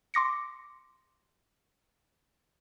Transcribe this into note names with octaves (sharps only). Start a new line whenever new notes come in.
C6 D6 A#6 C#7